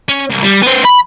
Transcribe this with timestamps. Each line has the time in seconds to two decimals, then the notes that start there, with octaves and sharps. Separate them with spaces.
0.09 C#4
0.30 C2
0.44 G3
0.63 B3 C5
0.85 B5